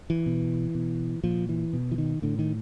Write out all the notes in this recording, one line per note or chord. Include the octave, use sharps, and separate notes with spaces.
E3
B2
B2
A#2 F3
E3
B2
E3
D#3
A2 D3
D#3